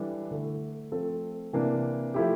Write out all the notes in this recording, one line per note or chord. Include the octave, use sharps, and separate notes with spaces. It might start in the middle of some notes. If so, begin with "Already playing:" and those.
Already playing: E3 G3 D4 A4
D3 A3 E4
F3 A3 C4 F4 A4
C3 E3 A#3 D4
F3 A3 E4 G4